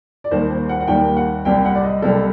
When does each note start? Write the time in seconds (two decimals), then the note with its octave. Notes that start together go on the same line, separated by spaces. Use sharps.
0.24 D5
0.31 D#2 D#3 G3 C5
0.50 C5
0.69 F#5
0.80 F#5
0.87 D#2 D#3 G3 G5
1.17 F#5
1.45 C2 C3 G3 G5
1.65 F#5
1.75 D5
1.84 D#5
2.02 C2 C3 G3 A4